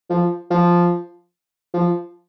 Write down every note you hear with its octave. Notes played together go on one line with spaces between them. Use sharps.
F3
F3
F3